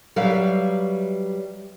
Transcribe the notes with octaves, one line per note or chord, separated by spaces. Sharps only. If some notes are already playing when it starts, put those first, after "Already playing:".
F#3 G3 B4 E5 F5